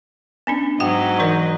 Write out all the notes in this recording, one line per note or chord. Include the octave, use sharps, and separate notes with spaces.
B3 C#4 D4
G#2 F#3 F#4 D#5 F#5 G5
E3 D#4 A#4